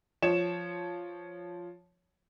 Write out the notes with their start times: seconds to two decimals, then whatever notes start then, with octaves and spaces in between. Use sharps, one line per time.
0.22 F3 C#5 E7